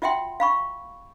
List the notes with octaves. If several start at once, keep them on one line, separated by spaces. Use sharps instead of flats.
F4 F#4 E5 F#5 G5 C6
F5 B5 C#6